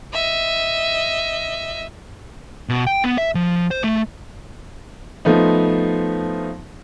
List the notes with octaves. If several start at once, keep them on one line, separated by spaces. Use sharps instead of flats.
D#5 E5
B2
G5
B3
E5
F3
C5
A3
F3 A3 B3 D#4